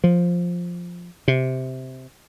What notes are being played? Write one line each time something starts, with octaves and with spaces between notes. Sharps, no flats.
F3
C3